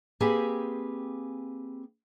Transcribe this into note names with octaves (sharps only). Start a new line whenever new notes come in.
A#3 C4 G4 G#4 B4 G#5